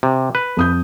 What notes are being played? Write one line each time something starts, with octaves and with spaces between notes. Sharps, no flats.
C3
B4
F2 D#6 G6